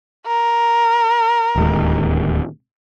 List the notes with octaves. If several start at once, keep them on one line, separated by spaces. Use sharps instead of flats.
A#4
D1 D#2 G#3